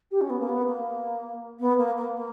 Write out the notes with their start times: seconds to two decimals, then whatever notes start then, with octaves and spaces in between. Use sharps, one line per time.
0.11 G4
0.21 C#4
0.29 B3
0.40 A#3
0.49 B3
0.67 A#3
1.59 B3
1.78 A#3
1.97 A#3
2.15 A#3